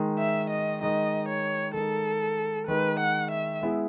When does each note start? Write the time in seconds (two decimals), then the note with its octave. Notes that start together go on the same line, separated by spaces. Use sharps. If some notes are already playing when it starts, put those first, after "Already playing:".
Already playing: D#3 G#3 D#4
0.19 E5
0.51 D#5
0.81 D#3 G#3 D#4 D#5
1.28 C#5
1.74 D#3 G#3 D#4 A4
2.68 D#3 G#3 D#4 B4
3.00 F#5
3.31 E5
3.62 G#3 B3 E4 G#4